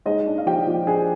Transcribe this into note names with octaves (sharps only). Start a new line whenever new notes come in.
G#3 D#4 D#5
D4
F5
F3 G4 G5
F3
D4 G#4 G#5